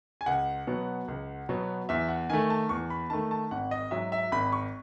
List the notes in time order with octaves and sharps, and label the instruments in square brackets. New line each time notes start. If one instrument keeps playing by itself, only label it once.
[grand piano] G#5
C#2 F#5
B2 F#3 B3
C#2
B2 F#3 B3
E2 E5
F#5
D#3 A3 G#5
A5
E2 C#6
B5
D#3 A3 A5
A5
G#1 F#5
D#5
G#2 F#3 E5
E5
G#1 B5
C#6